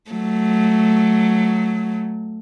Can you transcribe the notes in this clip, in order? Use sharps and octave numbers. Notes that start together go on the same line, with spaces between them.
F#3 A3